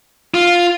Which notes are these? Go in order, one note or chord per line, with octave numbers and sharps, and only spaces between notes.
F4